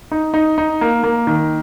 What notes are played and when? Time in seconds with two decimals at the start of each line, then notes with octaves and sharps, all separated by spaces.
0.12 D#4
0.34 D#4
0.58 D#4
0.81 A#3
1.04 A#3
1.27 D#3